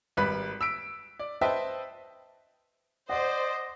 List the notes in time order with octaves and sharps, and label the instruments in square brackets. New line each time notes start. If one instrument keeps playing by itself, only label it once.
[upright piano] G#1 G3 B4 B5 F#6 B6
E6 B6 D7
D5
B4 C5 D#5 E5 G5 A5
[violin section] C5 [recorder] D5 [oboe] D#5 [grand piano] F#5